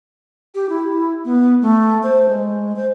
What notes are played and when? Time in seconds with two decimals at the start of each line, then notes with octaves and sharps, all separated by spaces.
0.55 G4
0.69 E4
1.25 B3
1.62 A3
2.03 C5
2.29 G#3
2.76 C5